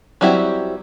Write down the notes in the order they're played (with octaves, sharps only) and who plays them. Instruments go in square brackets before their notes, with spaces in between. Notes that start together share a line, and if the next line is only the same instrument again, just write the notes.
[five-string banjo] F#3 G3 C4 E4 G4